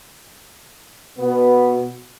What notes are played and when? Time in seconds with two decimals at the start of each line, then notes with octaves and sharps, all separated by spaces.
1.18 B2 B3